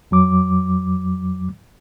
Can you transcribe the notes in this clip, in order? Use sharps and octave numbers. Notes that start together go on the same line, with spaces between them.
F2 F#3 D6